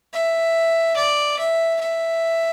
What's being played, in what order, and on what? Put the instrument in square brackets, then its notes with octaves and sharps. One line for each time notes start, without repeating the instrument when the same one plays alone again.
[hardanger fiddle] E5
D5
E5
E5